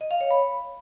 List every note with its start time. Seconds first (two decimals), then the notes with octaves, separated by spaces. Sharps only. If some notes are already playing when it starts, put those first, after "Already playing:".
0.01 D#5
0.11 F5
0.21 C#5
0.31 B5